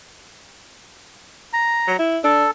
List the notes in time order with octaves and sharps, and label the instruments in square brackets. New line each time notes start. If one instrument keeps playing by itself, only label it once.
[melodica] A#5
[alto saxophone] F#3
E4
[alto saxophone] D4 [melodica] A4